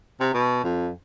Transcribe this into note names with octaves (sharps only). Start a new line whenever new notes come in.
C3
B2
F2